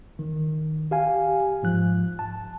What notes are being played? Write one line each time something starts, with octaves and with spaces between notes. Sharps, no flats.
D#3
G4 F5 G#5
G#2 F3 F#6
A5